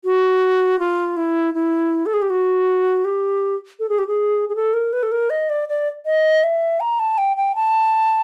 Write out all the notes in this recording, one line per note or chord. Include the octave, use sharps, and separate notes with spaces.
F#4
F4
E4
E4
A4
G#4
G4
F#4
G4
A4
G#4
G4
G#4
G#4
A4
A#4
B4
A4
A#4
D#5
D5
D5
D#5
E5
A#5
A5
G5
G5
A5